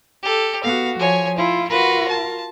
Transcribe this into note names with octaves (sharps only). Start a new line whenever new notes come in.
G4 A4
B3 F#4 F5
F3 C#5 G#5
E4 F4
F4 F#4 A#4 B4
A5